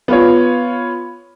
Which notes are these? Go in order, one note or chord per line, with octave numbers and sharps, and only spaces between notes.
B3 F4 C#5